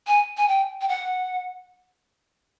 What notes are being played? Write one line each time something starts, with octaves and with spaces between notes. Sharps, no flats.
G#5
G#5
G5
G5
F#5